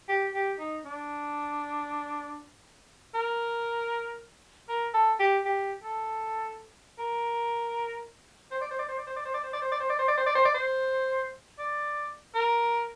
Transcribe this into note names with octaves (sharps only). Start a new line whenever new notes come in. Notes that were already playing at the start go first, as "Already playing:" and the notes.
G4
G4
D#4
D4
A#4
A#4
A4
G4
G4
A4
A#4
C5
D5
C5
D5
C5
D5
C5
D5
C5
D5
C5
D5
C5
D5
C5
D5
C5
D5
C5
D5
C5
D5
C5
D5
A#4